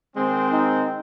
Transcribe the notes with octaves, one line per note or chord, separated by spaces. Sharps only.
D#3 G#3 C4
D#4